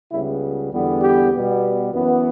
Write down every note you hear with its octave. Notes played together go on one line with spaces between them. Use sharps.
C#2 C#3 G3 B3 E4
E2 D3 G3 B3
G4
B2 G3 B3
F#2 E3 B3